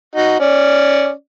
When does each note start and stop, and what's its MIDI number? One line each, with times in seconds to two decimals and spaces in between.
0.16 0.35 63
0.16 0.35 66
0.40 1.11 61
0.40 1.11 74